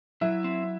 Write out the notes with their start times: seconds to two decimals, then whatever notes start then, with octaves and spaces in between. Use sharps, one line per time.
0.21 F#3 E4 E5
0.44 C4